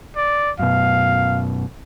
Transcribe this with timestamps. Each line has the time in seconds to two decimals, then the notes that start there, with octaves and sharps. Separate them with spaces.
0.16 D5
0.59 F#2 B2 F5